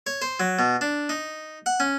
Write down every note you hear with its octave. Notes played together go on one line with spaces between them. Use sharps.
C#5
C5
F#3
B2
D4
D#4
F#5
C#4